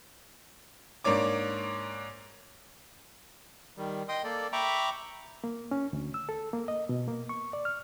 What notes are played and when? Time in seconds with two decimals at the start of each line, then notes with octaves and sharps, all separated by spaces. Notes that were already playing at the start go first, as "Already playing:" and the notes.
1.04 G#2 A#3 D4 C#5 D6
3.77 D#3 G3
4.09 D#5 G5 C6 D#6
4.24 A#3 A4 D5
4.53 E5 G5 A#5 B5 C#6 D6
5.44 A#3
5.71 C#4
5.93 D2
6.14 E6
6.29 A4
6.53 A#3
6.68 D#5
6.89 B2
7.08 A#3
7.29 C#6
7.53 D5
7.65 F6